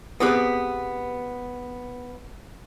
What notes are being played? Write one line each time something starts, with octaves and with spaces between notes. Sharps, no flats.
B3 C4 G4 G#4 B4